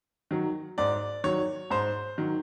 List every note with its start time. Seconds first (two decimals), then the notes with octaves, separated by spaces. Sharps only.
0.31 D#3 F#3
0.78 G#2 D5
1.24 D#3 F#3 C#5
1.70 G#2 C5
2.18 D#3 F#3